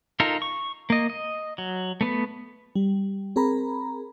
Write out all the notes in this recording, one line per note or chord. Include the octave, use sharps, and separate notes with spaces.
D#4 F4 A4 A#4
C#6
A#3 D#5
D#5
F#3
A3 B3 B4
G3
C4 G#4 A#4 A#5 B5